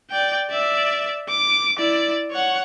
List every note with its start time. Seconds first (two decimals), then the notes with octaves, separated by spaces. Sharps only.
0.10 D5 G5
0.51 D5 E5
1.29 D6
1.77 E4 D5
2.31 C#5 F#5